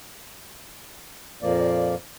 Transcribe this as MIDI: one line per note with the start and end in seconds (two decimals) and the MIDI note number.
1.42 1.95 41
1.42 1.95 46
1.42 1.95 53
1.42 1.95 58
1.42 1.95 74